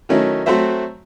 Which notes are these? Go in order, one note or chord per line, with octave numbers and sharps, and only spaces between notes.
D#3 F#3 A3 C#4 D#4 E4
F#3 A3 C4 F#4 C5 E5